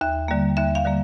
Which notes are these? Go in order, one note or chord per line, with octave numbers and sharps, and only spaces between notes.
D#2 E5
D3 G3 A#3
D#2 E5
F5
D3 G3 A#3